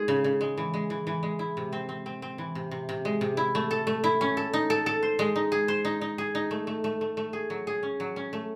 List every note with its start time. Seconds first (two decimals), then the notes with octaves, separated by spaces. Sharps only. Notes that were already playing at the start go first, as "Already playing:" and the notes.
Already playing: G#3 D#4 G#4
0.08 C#3
0.24 C#3
0.41 G#3
0.58 E3
0.74 G#3
0.90 E3
1.07 E3
1.23 G#3
1.39 E4
1.57 C3
1.73 C4
1.89 C4
2.06 C4
2.22 C4
2.38 E3
2.55 C3
2.71 C3
2.89 C3
3.05 G#3
3.21 C3
3.37 E4
3.55 A3
3.71 A4
3.87 A3
4.04 E4
4.21 C#4
4.37 A4
4.53 D#4
4.70 A4
4.86 A4
5.03 C5
5.19 G#3
5.36 D#4
5.52 G#4
5.68 C5
5.85 D#4
6.01 D#4
6.18 G#4
6.35 D#4
6.51 A3
6.67 A3
6.84 A3
7.01 A3
7.17 A3
7.33 G#4
7.50 F#3
7.67 G#4
7.83 C#4
8.00 F#3
8.16 C#4
8.33 A3